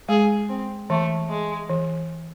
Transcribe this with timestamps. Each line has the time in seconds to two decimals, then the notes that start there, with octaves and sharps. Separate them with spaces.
0.09 G#3 G#4
0.49 C4
0.90 E3 A3
1.30 G#3
1.69 E3